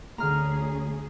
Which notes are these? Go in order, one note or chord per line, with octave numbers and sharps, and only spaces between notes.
D2 D3 A3 C#4 G#4 A#5 F6